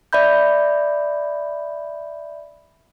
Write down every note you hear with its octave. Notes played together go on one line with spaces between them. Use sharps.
D5 E5 B5 G6